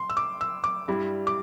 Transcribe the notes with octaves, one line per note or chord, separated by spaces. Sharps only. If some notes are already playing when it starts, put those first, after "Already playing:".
Already playing: C6
E6
D6
E6
D6
G2 G3 E4
D6